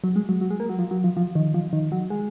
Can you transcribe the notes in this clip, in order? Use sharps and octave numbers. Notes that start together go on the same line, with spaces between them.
F#3
G#3
F#3
F#3
G#3
A#3
F#3
F3
F#3
F3
F3
D#3
F3
D#3
F#3
G#3